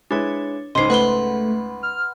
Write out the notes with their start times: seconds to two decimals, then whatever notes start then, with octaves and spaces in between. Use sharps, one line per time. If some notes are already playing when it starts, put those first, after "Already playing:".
0.11 G#3 D4 E4 B4 C#5
0.75 C#2 G#2 C5 D#5 C6 C7
0.90 A3 B4 F#5 B5 C6 G7
1.83 F6